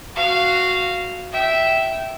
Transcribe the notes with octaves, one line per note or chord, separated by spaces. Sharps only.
F#4 F5
E5 G5